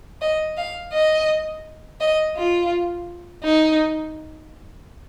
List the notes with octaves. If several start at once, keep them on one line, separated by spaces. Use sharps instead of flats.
D#5
F5
D#5
D#5
F4
D#4